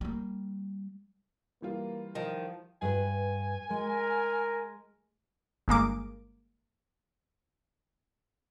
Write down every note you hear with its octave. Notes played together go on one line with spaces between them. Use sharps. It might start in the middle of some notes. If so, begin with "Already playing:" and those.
G3 A#3
E3 G3 A#3 F4
D#3 F3
G2 B4 G#5
G#3 A#4
G1 G#3 A#3 D6